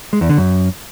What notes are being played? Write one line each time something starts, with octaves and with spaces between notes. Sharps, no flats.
G#3
E2
D3
F#2